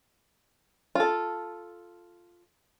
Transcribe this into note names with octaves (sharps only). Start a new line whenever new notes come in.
F4 A4